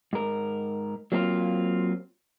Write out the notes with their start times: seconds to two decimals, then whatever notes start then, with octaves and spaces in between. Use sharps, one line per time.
0.13 G#2 A#4
1.12 F#3 A#3 C4 D4 F4